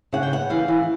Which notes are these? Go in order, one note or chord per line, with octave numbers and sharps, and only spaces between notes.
C#3 F#5
G5
B3 F#5
E3 F5
E3